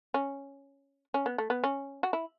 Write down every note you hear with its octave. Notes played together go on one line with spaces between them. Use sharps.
C#4
C#4
B3
A3
B3
C#4
F#4
E4